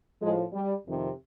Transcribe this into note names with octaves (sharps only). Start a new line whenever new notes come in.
A2 F3 G#3
G3
F2 C3 D#3